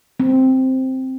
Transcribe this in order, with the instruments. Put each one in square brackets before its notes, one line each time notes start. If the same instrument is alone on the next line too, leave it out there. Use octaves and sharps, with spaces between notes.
[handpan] C4